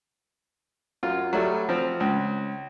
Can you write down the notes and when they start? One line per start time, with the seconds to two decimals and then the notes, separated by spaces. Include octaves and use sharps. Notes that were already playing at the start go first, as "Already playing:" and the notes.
1.03 F#2 F4
1.33 F#3 G3 A3
1.69 F3 C4
2.00 C#2